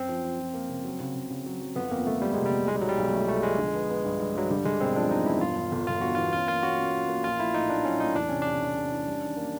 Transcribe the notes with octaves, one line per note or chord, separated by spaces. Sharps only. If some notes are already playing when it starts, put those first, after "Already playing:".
Already playing: F#2 C4
F3
F3
F3
A#3
C#3
F#3
C#3
C#3
C#3
F#3
F#3
G1 B3
F2 A#3
G1 A3
G1 G3
C3 G#3
G3
G1
B1 G#3
G3
B1 F#3
G3
B1
F3 A3
B1 A3
F3 G#3
D3
B3
B3
G2
G2
G2 F#3
D3 G3
D3 G#3
E1 C4
F3 D4
E1 D#4
E1 E4
G2 F4
G2
G1
G1 F4
G2 F#4
E3 F4
C#4 F4
A#3 F4
C#4 F#4
C#4
A#3
A#3
A#1 F4
A#1 E4
A2 D#4
A2 D4
F#3 C#4
A2 D#4
E2 D4
C3 C#4
C3 D4
E2
C3
E3
G3
D#3
A#3